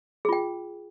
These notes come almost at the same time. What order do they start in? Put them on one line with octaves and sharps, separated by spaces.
G#4 F4 G5